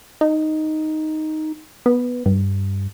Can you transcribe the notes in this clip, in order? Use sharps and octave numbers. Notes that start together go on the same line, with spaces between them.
D#4
B3
G2